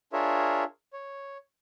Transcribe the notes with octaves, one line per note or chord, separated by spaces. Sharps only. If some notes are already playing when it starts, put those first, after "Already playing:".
D4 F4 G#4 A#4 C#5 E5
C#5